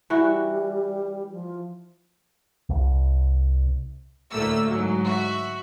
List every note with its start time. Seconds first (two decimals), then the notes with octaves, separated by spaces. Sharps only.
0.10 E3 G3 E4 F#4
1.32 F3
2.69 C2
4.31 D2 A2 A3 A#3 E6
4.69 G#2 F#3
5.05 F#4 E5